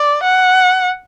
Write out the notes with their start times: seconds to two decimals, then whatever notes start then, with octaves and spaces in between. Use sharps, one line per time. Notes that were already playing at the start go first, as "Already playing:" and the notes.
Already playing: D5
0.23 F#5